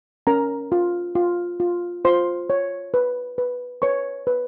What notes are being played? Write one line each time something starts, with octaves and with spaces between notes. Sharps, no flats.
C#4 A#4 A#5
F4
F4
F4
F4 C5 C6
C#5
B4
B4
B4 C#5 C#6
B4